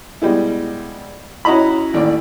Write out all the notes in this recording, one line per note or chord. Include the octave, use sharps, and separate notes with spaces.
B2 G3 G#3 E4
C#4 E4 F#4 D#5 A#5 B5
A1 D#2 D5